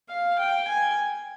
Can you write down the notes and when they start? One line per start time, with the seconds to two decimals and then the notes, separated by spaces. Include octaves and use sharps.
0.10 F5
0.39 G5
0.68 G#5